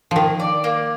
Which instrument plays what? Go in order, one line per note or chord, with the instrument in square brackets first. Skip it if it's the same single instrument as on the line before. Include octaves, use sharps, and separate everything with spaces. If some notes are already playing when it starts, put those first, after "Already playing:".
[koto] D#3 F3 [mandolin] A#3
[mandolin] D5
A#3